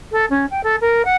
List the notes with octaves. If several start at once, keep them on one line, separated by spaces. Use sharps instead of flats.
A4
C#4
G5
A4
A#4
F#5